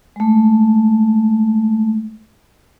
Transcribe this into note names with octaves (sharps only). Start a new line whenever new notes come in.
G#3 A3